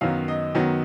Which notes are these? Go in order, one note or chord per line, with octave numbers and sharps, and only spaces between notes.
F#2 D#3 F#3 B3 F5
D#5
F#2 D#3 F#3 B3